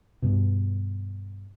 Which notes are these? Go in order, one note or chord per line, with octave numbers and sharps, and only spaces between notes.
G2 B2